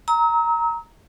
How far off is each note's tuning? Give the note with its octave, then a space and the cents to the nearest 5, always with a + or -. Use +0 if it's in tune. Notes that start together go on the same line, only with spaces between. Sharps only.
A#5 +0 E6 -45